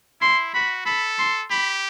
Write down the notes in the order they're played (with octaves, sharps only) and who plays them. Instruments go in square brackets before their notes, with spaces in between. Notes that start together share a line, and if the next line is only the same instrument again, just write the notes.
[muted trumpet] E4 [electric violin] C6
[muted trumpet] F#4 [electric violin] B5
[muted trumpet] A4 [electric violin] B5
[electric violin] C6
[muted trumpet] G4 [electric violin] B5